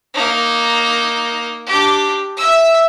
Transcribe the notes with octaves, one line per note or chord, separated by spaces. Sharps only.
A#3 D#4
D4 G4
E5 E6